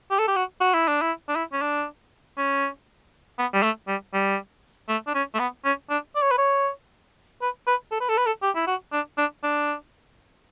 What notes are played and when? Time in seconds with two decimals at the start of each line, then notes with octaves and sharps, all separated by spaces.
0.10 G4
0.19 A4
0.27 G4
0.36 F#4
0.60 F#4
0.74 E4
0.88 D4
1.01 E4
1.28 D4
1.36 E4
1.52 C#4
1.61 D4
2.37 C#4
3.39 B3
3.53 G3
3.63 A3
3.88 G3
4.13 G3
4.89 A3
5.07 D4
5.15 C#4
5.34 A3
5.39 B3
5.65 C#4
5.90 D4
6.15 D5
6.22 C#5
6.31 B4
6.38 C#5
7.42 B4
7.67 B4
7.91 A4
8.01 B4
8.09 A4
8.17 B4
8.26 A4
8.42 G4
8.55 E4
8.67 F#4
8.93 D4
9.18 D4
9.43 D4